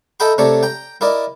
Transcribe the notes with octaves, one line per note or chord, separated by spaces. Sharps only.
A4 D#5 E5 G5 A#5 B5
C3 A3 C#5 D5 A#5
G5 A#5
E4 A#4 D5 D#5